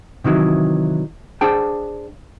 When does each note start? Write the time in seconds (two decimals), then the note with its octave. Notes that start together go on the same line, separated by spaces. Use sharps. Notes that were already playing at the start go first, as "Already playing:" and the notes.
0.24 C3 D#3 E3 F#3
1.41 D4 G#4 C5 G5 A5